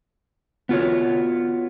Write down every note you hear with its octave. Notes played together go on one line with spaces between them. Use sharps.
B3 F4 F#4 C#5